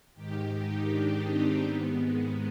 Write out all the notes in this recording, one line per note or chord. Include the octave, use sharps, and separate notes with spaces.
G#2 D#3 G4
D#4
D4
C4
G#2 D#3 B3
G#3